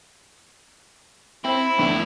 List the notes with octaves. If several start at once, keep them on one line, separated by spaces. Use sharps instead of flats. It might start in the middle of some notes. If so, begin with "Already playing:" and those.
C4 E4 C5 B5
A#1 E2 D3 A3 E5 G5